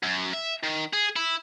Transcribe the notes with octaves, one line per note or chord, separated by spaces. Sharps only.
F#2
E5
D#3
G#4
E4